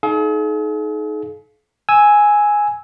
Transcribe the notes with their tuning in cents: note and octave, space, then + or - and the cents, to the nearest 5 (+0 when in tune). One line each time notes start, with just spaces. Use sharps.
D#4 +5 G#4 +45 F5 +0
G#5 +0 E6 -10